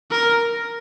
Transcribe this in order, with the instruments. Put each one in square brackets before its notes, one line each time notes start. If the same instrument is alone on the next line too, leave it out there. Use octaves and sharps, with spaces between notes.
[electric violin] A#4